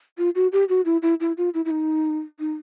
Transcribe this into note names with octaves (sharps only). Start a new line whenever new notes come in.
F4
F#4
G4
F#4
E4
E4
E4
F4
E4
E4
D#4
D#4